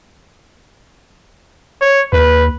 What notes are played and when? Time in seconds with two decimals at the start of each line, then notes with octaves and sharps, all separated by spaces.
1.81 C#5
2.13 D#2 B4